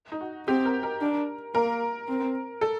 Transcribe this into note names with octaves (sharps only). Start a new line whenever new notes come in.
D#4
F#4
C4 G4
A#4
A#4
D4
A#3 A#4
C4
A4